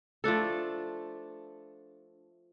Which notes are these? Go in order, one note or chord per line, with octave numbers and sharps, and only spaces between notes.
F3 A3 D4 A4